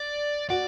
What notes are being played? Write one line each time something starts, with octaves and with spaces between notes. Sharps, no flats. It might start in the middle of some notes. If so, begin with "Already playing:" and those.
Already playing: D5
F#4 D5